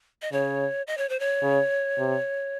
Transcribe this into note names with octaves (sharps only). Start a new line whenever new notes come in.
D#5
C#3 C#5
D#5
C#5
C5
C#5
C#3
C3